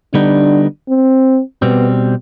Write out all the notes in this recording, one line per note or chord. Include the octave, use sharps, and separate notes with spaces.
D3 G3 B3 D4 D#4
C4
B2 G3 B3 C4